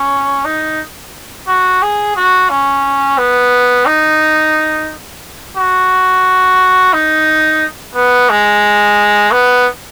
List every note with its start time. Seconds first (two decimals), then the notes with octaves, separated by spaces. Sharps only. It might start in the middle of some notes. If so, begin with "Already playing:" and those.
Already playing: C#4
0.45 D#4
1.48 F#4
1.82 G#4
2.16 F#4
2.50 C#4
3.18 B3
3.86 D#4
5.57 F#4
6.93 D#4
7.95 B3
8.29 G#3
9.31 B3